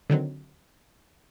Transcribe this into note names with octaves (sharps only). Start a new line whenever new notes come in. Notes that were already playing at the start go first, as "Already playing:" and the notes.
D3 D#3 F#3 C4